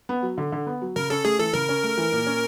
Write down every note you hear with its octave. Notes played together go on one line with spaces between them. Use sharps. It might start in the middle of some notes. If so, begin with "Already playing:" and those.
B3
F#3
D3
D3
B3
F#3
C#3 A#4
C#4 A4
A3 G#4
E3 A4
C#3 A#4
C#4
A3
E3
A#2
C#4